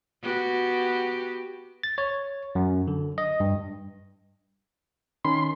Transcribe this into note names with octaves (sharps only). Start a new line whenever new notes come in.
B3 F#4 G4
A6
C#5
F#2
D3
D#5
G2
D#3 C#4 B5 C6